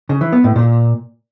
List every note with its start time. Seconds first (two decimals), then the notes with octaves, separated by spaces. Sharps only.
0.09 C#3
0.21 E3
0.32 B3
0.44 A2
0.56 A#2